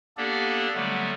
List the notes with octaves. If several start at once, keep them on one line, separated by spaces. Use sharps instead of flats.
A#3 B3 D4 G4 A4 D5
D3 F#3 G3 A3 B3